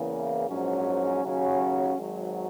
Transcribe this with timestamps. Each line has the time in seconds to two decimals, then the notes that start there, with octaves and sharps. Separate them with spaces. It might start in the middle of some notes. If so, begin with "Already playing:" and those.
Already playing: E2 C#3 E3 A#3
0.48 A#1 G#2 F#3 C#4
1.23 D#2 C#3 F#3 C#4 F#4
1.97 G#1 G#2 F#3